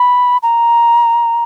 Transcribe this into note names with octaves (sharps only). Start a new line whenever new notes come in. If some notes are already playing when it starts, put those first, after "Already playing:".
Already playing: B5
A#5